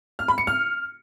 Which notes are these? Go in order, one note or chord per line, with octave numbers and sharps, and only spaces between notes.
F6
B5
C#7
F6